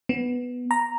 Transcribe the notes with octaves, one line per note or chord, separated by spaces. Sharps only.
B3
A#5